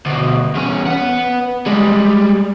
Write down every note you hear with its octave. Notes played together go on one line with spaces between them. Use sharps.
D2 B2
E2 C#4
B4 F#5
G3 G#3